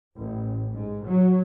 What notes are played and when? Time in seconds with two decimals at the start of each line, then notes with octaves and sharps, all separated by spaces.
0.17 A1
0.74 G#2
1.07 F#3